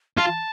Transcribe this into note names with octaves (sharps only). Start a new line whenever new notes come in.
F4 A5